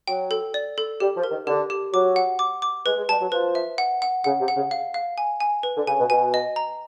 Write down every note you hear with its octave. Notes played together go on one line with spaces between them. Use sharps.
F#3 G5
A4
D5
A4
G3 G4
F3
A#4
D#3
D3 G4
G4
F#3 D6
F#5
D6
D6
G#3 B4
G#3
G3 A5
F#3
F3 B4
E5
F#5
F#5
C#3 F#5
C3
F#5
C#3
F5
F5
G#5
G#5
B4
D3
C#3 G#5
B2
B2 G#5
D#5
A#5